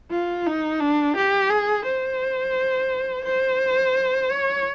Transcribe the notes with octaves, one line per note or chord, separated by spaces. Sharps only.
F4
D#4
D4
G4
G#4
C5
C5
C#5